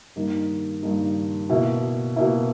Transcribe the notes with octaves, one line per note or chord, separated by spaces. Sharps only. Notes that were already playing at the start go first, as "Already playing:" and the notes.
G2 D#3 A#3 D#4
G2 D#3 A#3 D#4
B2 A#3 E4
B2 A#3 E4